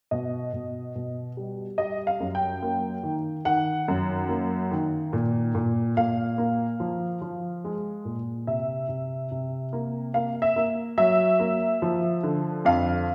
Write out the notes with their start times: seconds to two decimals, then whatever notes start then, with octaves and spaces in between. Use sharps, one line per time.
0.11 B2 D#5
0.53 B2
0.95 B2
1.37 G3
1.78 G3 D#5
2.07 F5
2.20 F#2
2.35 G5
2.63 A#3
3.03 D#3
3.45 D#3 F#5
3.88 F#2
4.29 A#3
4.71 D#3
5.13 A#2
5.55 A#2
5.97 A#2 F5
6.38 A#3
6.80 F3
7.22 F3
7.64 G#3
8.05 A#2
8.47 C3 E5
8.89 C3
9.31 C3
9.73 A#3
10.14 A#3 F5
10.42 E5
10.56 A#3
10.98 F#3 E5
11.40 A#3
11.82 F3
12.23 D3
12.65 F2 F5